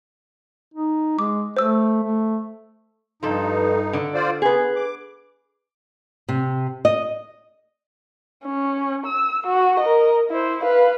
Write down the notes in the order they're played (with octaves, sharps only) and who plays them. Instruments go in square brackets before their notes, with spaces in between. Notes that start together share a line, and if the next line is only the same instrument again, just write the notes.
[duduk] D#4
[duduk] G#3 [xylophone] D6
[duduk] A3 [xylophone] C5 E6
[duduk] A3
[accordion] G2 D#4 [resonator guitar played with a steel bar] F3 A4
[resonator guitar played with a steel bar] D3
[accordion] F4 C5 D5
[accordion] B3 [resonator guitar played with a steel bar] G#4 B4
[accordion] D6
[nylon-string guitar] C3
D#5
[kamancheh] C#4
E6
F#4
A#4 D#5
E4 C5
B4 F5